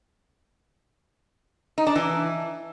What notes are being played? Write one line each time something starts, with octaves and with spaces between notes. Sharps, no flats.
D#4
D4
E3